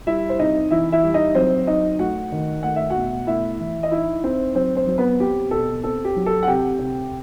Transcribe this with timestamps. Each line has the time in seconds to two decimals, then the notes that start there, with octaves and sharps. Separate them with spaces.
0.07 G3 E4 E5
0.29 C5
0.39 C3 D#4 D#5
0.71 E3 E4 E5
0.92 E4 E5
1.03 G3
1.14 D#4 D#5
1.35 F#3 C4 C5
1.67 D#4 D#5
1.99 A3 F#4 F#5
2.32 D#3
2.63 A3 F#5
2.76 E5
2.90 F#4 F#5
2.96 B2
3.27 A3 E4 E5
3.60 E3
3.83 D#5
3.91 D#4 E4 E5
4.23 C4 D#4 C5
4.55 F#3 C4 C5
4.76 C4 C5
4.87 F#3
4.98 B3 B4
5.20 C4 G4
5.51 B2 A4
5.84 C4 A4
6.05 G4
6.16 F#3
6.26 A4
6.43 F#5
6.47 C3 G4 G5
6.79 C3